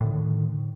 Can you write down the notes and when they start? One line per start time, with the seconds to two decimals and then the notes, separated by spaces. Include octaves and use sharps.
0.01 A2
0.03 D3
0.06 D#3